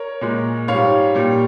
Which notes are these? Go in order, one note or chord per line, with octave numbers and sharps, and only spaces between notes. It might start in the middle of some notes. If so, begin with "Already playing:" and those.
Already playing: A#4 C#5
A#2 G#3
G#2 G3 C#5 F5
A#2 G3